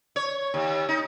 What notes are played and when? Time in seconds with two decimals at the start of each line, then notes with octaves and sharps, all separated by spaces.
0.16 C#5
0.54 D#2
0.89 D#4